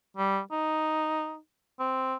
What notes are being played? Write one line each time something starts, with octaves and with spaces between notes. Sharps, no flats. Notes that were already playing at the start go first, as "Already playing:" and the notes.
G3
D#4
C4